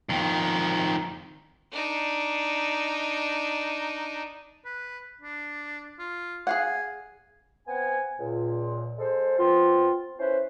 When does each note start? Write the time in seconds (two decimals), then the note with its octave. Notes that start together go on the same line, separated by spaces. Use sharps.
0.09 F2 D#3
1.72 D4 D#4
4.65 B4
5.21 D4
5.99 F4
6.47 G#4 F5 F#5 G#5
7.67 B3 C4 F#5 G#5
8.18 C#2 A#2
8.99 G#3 A4 C5
9.38 B3 C4 F4
10.19 C#4 E4 B4 C5